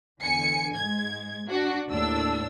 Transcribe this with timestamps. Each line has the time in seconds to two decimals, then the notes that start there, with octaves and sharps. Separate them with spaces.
0.22 E2 D3 G#5 C#7
0.76 G#2 G#3 G#6
1.49 D4 F#4
1.90 D#2 A2 D4 E6